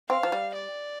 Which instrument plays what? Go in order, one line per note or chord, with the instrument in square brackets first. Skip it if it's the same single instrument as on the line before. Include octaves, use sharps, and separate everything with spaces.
[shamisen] C4 [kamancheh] F5
[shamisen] F3
G3
[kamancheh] D5